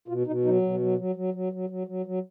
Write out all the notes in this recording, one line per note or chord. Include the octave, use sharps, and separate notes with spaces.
B2 F4
B2 D#4
F#3 D#4
B2
F#3
F#3
F#3
F#3
F#3
F#3
F#3
F#3